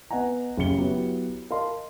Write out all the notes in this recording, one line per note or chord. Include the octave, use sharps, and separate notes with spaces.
B3 B4 D#5 F#5 G#5 A#5
F#1 C#3 G4 C#7 G7
F#3 B3 E4 G4
A#4 D#5 F5 A5 C6